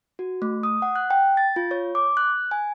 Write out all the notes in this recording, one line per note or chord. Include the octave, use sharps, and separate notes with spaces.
F#4
A3
D#6
F#5
F#6
G5
A6
F4
C#5
D6
F#6
G#5